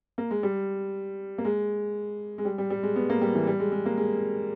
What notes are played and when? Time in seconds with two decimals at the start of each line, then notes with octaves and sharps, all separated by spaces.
0.18 A#3
0.31 G#3
0.43 G3
1.38 A#3
1.45 G#3
2.38 G#3
2.45 G3
2.58 G3
2.70 G3
2.83 G#3
2.96 B3
3.10 A#3
3.21 G3
3.35 E3
3.47 G3
3.60 G#3
3.72 G#3
3.86 A#3
3.98 G#3